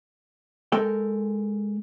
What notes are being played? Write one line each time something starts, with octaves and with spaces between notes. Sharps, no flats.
G#3 A4 A#4 G5